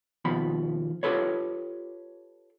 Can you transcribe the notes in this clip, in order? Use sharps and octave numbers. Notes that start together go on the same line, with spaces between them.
D#2 B2 F3 B5
F4 G4 A4 B4 C#5